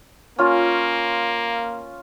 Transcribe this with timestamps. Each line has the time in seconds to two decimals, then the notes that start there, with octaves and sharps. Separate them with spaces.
0.38 A#3 C#4 F4